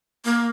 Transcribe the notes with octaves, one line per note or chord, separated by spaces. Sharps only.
A#3